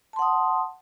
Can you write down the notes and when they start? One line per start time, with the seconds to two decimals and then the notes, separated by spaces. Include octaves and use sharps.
0.13 A5
0.16 C6
0.19 F#5
0.22 D#6